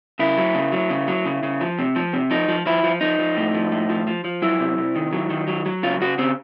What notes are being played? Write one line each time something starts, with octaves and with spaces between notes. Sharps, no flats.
C#3 E4
F#3
C#3
F#3
C#3
F#3
C#3
C#3
F3
C3
F3
C3
F3 D#4
F3
F3 E4
F3
F3 D#4
F3
A2
F3
A2
F3
F3
F3
F#3 E4
C3
C3
D#3
F#3
D#3
F#3
F#3
C#3 F4
C#3 F#4
C#3 C4